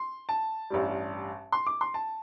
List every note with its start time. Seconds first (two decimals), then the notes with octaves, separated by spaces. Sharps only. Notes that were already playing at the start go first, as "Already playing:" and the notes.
Already playing: C6
0.29 A5
0.70 A1 G2 G3
1.52 C6
1.67 D6
1.81 C6
1.94 A5